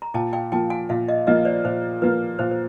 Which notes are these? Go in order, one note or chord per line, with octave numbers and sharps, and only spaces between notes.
A#5
A#2 G5 A5
F5 G5
F3 A#3 G5 A5
F#5 G#5
A#2 E5 F#5
D#5 F5
F3 A#3 D#5 F5
C5 D5
A#2 C5
F3 A#3 B4
A#2 C5
C5